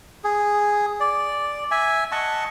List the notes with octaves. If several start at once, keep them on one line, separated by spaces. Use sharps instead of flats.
G#4
D5
E5 G#5
D#5 F#5 A5 C#6